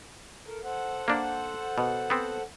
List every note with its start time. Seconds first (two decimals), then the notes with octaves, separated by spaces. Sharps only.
0.47 A4 A#4
0.64 A4 C5 F#5
1.08 A#3 D4
1.78 B2
2.10 B3 C4